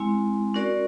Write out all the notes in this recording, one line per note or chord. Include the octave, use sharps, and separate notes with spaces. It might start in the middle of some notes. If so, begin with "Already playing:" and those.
Already playing: G#3 C4 E4
C#4 F#4 A#4 D5